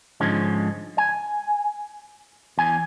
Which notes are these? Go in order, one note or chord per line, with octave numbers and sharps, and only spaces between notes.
G#2 D3 F3 G#3 C#4
G#5
E2 G#5